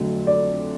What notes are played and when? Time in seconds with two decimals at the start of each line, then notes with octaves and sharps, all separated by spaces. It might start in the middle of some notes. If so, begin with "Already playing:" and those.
Already playing: F2 D3 F#3 A3
0.27 D5